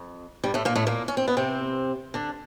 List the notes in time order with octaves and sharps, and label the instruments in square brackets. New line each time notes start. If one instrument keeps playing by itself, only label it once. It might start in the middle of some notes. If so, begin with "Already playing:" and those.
Already playing: [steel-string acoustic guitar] F2
G2 G3
A2 A3
A#2 A#3
A2 A3
A#2 A#3
C#4
C4
B3
C3 C4
D3 D4